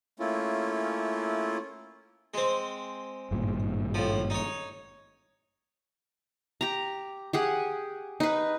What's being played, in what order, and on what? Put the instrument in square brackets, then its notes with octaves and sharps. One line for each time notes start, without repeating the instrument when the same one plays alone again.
[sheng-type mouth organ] A3 A#3 C#4 E4 F4
[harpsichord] G#3 C4
[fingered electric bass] G#1 G2 A#2
[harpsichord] A2 F3
D#4 C#5
[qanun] G4 A#5
G4 G#4 F#5
D#4 B4